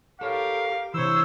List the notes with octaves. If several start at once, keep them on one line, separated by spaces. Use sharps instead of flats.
G4 A4 A#4 C#5 F5
C3 E3 C5 C#5 E6